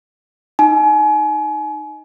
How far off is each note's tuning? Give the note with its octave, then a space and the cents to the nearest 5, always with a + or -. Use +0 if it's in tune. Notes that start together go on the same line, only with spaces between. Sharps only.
D#4 +0 G#5 +35